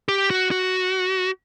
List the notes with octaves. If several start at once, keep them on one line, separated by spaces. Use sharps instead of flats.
G4
F#4
F#4